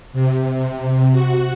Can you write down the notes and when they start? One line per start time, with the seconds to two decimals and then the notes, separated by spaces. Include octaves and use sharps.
0.13 C3
0.53 C3
1.12 F#4